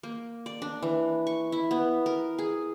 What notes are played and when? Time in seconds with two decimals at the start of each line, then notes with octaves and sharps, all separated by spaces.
0.03 A#3
0.46 D5
0.62 D4
0.83 E3
1.27 C#6
1.52 E4
1.71 B3
2.06 A#4
2.39 G#4